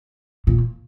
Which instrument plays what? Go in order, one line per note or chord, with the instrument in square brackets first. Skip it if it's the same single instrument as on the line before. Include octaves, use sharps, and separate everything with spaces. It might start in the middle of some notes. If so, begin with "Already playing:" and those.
[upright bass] A#2